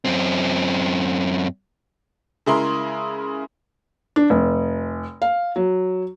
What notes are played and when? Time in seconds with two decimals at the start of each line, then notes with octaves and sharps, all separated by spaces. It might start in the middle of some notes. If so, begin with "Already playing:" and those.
0.05 F#2 C4
2.46 C#3 G#3 E4 A#4 C6
4.16 D4
4.30 F1
5.22 F5
5.56 F#3